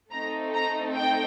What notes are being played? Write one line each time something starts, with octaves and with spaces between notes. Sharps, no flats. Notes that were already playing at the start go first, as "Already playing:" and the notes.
A3 C4 D#4 A4 A#5
A#5
G5